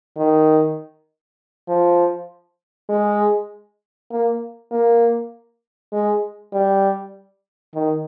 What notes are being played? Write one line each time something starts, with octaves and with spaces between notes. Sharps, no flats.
D#3
F3
G#3
A#3
A#3
G#3
G3
D#3